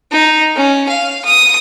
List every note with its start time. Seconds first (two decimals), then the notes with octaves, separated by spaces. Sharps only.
0.12 D#4
0.55 C#4
0.89 F5
1.25 D#6